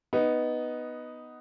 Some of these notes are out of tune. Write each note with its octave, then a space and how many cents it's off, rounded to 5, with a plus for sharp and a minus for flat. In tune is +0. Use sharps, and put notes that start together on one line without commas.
B3 +0 D#4 +0